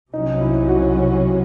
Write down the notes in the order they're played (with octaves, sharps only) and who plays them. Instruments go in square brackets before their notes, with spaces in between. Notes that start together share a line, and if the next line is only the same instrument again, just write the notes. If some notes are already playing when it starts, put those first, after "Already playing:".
[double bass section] C2 C3 F#3 C#4 [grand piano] D#4
[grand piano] E4
F#4
F#4